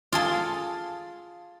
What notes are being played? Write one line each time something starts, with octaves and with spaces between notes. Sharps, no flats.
F4 G#4 A4